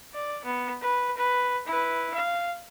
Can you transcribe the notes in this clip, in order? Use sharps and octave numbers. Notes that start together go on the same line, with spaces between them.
D5
B3
B4
B4
E4 B4
F5